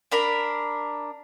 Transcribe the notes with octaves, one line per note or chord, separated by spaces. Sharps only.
D4 A#4 B5